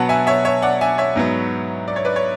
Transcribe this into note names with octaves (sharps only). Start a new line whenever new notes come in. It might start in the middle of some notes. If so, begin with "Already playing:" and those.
Already playing: B2 F#3 B3 F#5 A5
E5 G#5
C#5 E5
C#5 E5
D5 F#5
E5 G#5
C#5 E5
G#2 F#3 B3
D5
C#5
B4 D5
C#5